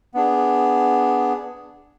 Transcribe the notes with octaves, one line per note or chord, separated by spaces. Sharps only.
B3 D4 G#4